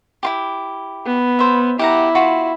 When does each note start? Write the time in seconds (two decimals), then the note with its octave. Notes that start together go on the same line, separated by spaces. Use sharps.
0.23 E4 F4 G4
1.06 B3
1.39 C5 E5
1.79 E4 G4 F#5 A#5
2.15 F4 F#4 B5